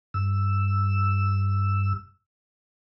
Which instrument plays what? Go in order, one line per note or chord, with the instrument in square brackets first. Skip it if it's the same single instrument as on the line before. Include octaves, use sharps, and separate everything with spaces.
[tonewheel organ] G2 E6